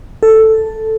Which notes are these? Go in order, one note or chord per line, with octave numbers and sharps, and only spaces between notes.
A4